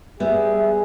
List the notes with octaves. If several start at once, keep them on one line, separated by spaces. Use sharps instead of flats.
G3 B3 G#4 E5